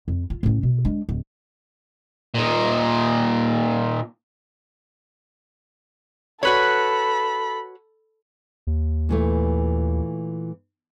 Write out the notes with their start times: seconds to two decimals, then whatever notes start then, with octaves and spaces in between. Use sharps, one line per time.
0.08 F2
0.30 F4
0.43 A2 C#4
0.63 B2
0.85 G#3 D4
1.09 D1
2.34 A#2 D#4
6.43 F#4 A4 B4 C#5 B5
8.67 D#2
9.09 A#2 E3 A3